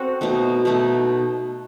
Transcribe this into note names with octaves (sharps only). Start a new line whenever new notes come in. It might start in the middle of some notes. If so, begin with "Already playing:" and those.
Already playing: C4 F#4 A4
B2 A3 D#4
B2 A3 D#4